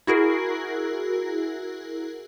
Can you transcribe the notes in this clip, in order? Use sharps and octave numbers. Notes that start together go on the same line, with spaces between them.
E4 F#4 G#4 A#4